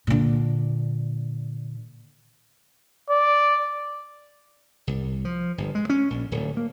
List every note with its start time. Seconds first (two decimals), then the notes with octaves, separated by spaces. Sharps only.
0.07 A#2 D3
3.10 D5
4.87 C2
5.25 F3
5.58 G1
5.75 G#3
5.90 C#4
6.10 A#1
6.32 D1
6.57 A#3